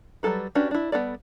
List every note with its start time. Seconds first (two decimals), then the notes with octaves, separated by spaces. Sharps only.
0.23 F#3 G3 A#3 A4 B4
0.55 C#4 D4 F#4 G4 B4
0.71 D4 E4
0.92 G3 B3 D4 A4 D5